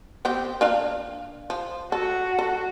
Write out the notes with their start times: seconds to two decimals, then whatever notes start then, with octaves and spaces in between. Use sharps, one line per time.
0.25 B3 C4 G4
0.61 A#3 D4 F5
1.50 F3
1.92 F#4 A4
2.39 A4